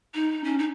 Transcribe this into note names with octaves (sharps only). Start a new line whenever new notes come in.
D#4
C#4
D#4